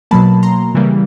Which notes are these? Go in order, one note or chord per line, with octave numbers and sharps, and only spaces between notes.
B2 F#3 A#3 A5 B5
A#5 C6
C#3 E3 G3 A#3